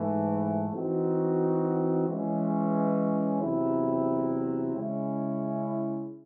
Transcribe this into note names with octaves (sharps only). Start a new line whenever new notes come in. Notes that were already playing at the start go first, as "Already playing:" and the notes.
Already playing: G#2 E3 A3
E3 C4 D#4 F#4
E3 G#3 C#4
E2 C3 F#3 C4 E4
C#3 G#3 C#4 E4